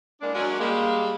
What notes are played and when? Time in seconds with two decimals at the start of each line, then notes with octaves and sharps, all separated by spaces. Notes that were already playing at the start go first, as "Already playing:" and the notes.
0.21 A2 G#3 A#3 D4
0.34 F#3 G#3 A#3 C#4 D4 F#4
0.59 G3 G#3 A#3